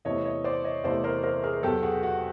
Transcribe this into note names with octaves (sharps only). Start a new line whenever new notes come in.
E2 C3 E3 A3 C#5 D#5
C#5 D#5
C5 D5
C#5 D#5
E2 C3 E3 A3 C5 D5
A#4 C5
A#4 C5
G#4 A#4
E2 B2 F#3 G4 A4
F#4 G#4
F#4